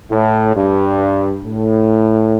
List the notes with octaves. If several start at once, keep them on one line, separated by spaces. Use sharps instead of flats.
A2
G2
A2